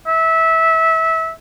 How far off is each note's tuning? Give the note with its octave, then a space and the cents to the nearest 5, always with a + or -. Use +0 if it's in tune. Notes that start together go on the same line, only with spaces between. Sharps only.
E5 -20